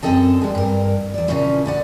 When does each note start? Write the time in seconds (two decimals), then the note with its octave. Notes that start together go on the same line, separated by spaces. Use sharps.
0.02 F#2 F3 C4 A4 D#5 A5
0.41 G3 G#3
0.55 G2 A#4
1.14 E2 D5
1.28 A#2 C#3 E3 F3 C#4 E4
1.66 D3 D5 F#5